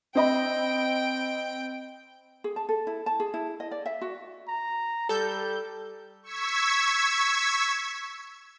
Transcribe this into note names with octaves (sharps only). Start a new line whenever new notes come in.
C4 D#5 G5 B5
G#4
A5
A4
E4
A5
G#4
E4
D#5
D5
E5
F#4
A#5
G3 A4 G6
C#6 E6 G#6 B6